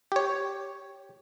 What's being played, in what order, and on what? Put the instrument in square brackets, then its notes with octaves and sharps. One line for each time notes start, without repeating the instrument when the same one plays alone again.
[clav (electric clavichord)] G4 C#5